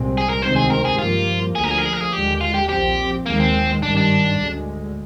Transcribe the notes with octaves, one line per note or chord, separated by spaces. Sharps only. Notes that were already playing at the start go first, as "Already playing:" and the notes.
Already playing: C2 A#2 G#3 C4
G#4
A#4
D2 C3 D#3 G#3 C4 C5
G#4
A#4
G#4
G2 F3 A#3 F4
D2 D3 F3 A#3 G#4
A#4
G#4
A#4
G#4
A#4
G#4
D#2 D3 G#3 G4
F4
G4
A#1 A#2 F3 C4 G4
D#2 D#3 G#3 A#3
C4
G#1 G2 D#3 G3 D4
D4
D2 D3 G#3